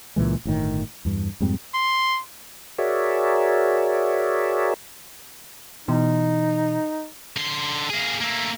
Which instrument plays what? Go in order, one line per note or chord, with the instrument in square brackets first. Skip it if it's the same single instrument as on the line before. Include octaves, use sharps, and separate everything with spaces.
[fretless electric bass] C#2 A#2 E3 G#3
G1 A2 D#3
E2 G2
F2 G#2 G3 C4
[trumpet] C6
[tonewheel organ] F#4 G#4 A#4 C#5 D5 E5
[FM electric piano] B2 E3 [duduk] D#4
[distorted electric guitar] D3 C6
A#3 G#4
A3 A#3